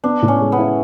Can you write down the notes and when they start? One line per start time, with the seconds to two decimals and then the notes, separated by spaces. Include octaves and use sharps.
0.04 B3 D4
0.22 A2
0.28 C#4
0.41 G#3
0.52 B3
0.58 E4